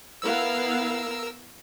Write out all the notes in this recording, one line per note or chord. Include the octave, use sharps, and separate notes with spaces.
B3 E4 A#4 F5 E6